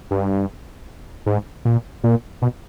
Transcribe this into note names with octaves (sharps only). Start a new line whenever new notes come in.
G2
G#2
A#2
A#2
B2